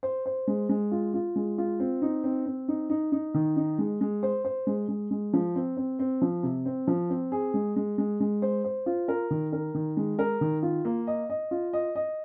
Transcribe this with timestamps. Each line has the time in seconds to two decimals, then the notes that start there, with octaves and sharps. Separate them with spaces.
0.03 C5
0.26 C5
0.47 G#3
0.69 G#3
0.92 F4
1.14 F4
1.36 G#3
1.58 F4
1.80 C4
2.02 D#4
2.24 C4
2.46 C4
2.68 D#4
2.90 D#4
3.12 D#4
3.34 D#3
3.56 D#4
3.79 G#3
4.01 G#3
4.23 C5
4.45 C5
4.67 G#3
4.88 G#3
5.11 G#3
5.33 F3
5.55 C4
5.77 C4
5.99 C4
6.22 F3
6.43 C3
6.66 C4
6.87 F3
7.10 C4
7.32 G#4
7.54 G#3
7.76 G#3
7.98 G#3
8.20 G#3
8.42 C5
8.64 C5
8.86 F4
9.08 A#4
9.31 D#3
9.53 A#4
9.75 D#3
9.97 G#3
10.19 A#4
10.41 D#3
10.63 F4
10.85 A#3
11.07 D#5
11.30 D#5
11.51 F4
11.73 D#5
11.95 D#5